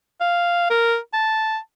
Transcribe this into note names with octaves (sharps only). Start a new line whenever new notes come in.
F5
A#4
A5